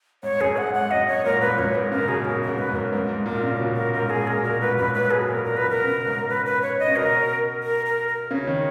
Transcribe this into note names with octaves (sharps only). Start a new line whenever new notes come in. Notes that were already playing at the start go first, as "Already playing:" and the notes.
G#2 C#5
F#2 G#4
G#2 F#5
G#2 F#5
F#2 D#5
G#2 C#5
A#2 A#4
G#2 B4
F#2 C#5
G#2 A#4
C#3 A#4
B2 G#4
B2 A#4
A#4
G#2
B4
F#2
A#4
G#2 A#4
G#2
A#2 A#4
C#3
A#2
B2
A#4
G#2 A#4
G#4
A#2 A#4
B2 A#4
G#2 B4
F#2 B4
G#2 B4
G#4
B2
A#2 A#4
A#4
B2 B4
A#4
C#3
G#2
B4
B4
C#5
D#5
C#3
B2 A#4
A#4
A#4
A#4
C#3 C#5
D#3